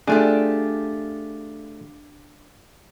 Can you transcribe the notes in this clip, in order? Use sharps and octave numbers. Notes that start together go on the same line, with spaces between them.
A3 D4 F4 G4 G#4